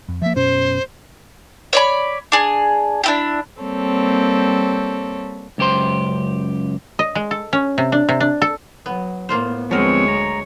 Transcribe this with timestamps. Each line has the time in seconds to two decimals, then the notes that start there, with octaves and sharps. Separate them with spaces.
0.09 F2
0.22 F3 A#3 E5
0.35 F#2 B2 C#4 C5
1.73 C#5 D5 B5
2.32 D4 G#4
3.04 D4 E4 G4
3.61 G3 A#3 C4 A4 C#5
5.58 C#2 F#2 G4 C5 C6
6.99 D#5
7.15 G#3
7.31 A4
7.53 C#4
7.78 C3
7.92 D4
8.09 C3
8.20 D4
8.42 A4
8.86 F#3 B3
9.29 A2 A#3 B3 F4 C5
9.71 D2 F3 F#3 G#3 B3 C4 A#4 C#5
10.08 A#5